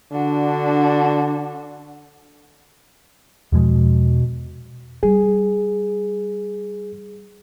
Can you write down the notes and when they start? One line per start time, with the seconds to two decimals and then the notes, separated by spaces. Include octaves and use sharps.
0.12 D3 D4 F#4
3.52 E2 B2 F3 G#3
5.03 G3 G#4